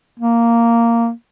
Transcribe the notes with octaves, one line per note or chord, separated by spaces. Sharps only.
A#3